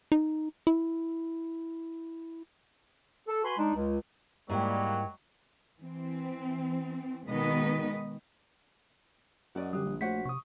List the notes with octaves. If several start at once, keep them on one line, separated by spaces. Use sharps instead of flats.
D#4
E4
A4
F#4 B4 G#5 B5 C6
G#3 D4 D#4
C#2
G#2 F#3 G3 A#3 E4 D#5 G5
E3 C4
B2 D#3 G#3 B3 B4 D#5
F#2 F#4 D5 D#5
D3 G3 D4 G4 D#6
A#1
A3 F#4 C5 C#5 F#5 B6
C3 C#6 D#6